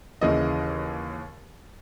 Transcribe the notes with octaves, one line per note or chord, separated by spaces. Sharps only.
D#2 C#3 E3 D#5